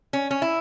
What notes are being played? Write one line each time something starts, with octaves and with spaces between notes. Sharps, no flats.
C#4
C#4
E4